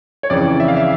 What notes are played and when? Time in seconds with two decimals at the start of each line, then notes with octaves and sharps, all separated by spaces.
0.23 C#5
0.30 F2 C#3 E3 D5
0.60 E5
0.68 F5
0.76 E5